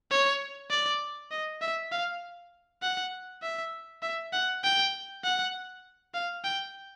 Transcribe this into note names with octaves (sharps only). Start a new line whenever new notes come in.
C#5
D5
D#5
E5
F5
F#5
E5
E5
F#5
G5
F#5
F5
G5